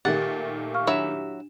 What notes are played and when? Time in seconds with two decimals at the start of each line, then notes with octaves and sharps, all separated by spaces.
0.05 A#2 D#3 A3 G4 A#4 F#5 A6
0.74 F5 C#6 F6
0.87 F#3 D4 E4 E5 E7